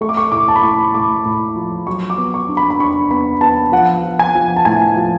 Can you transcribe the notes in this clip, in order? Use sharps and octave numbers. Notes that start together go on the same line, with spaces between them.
A3 C#6
D6
C#6
A2 D6
A5
B5
A2 C#6
A2 D6
A2
F3
F#3 C#6
D6
B3
C#6
D4
B5
B5
D4 C#6
B3 B5
B3 A5
F3 F#5
F3
G#5
F3
A5
A2 G#5
F3